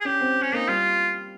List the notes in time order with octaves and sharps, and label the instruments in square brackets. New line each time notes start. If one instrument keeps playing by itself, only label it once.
[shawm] G#4
[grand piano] C#4 [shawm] G4
[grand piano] C4
[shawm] C#4
[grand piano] A#3 [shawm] D#4
[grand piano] G3 [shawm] F4